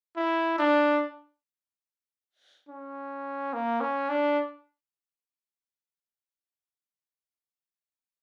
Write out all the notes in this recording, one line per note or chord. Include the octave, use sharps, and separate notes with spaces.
E4
D4
C#4
A#3
C#4
D4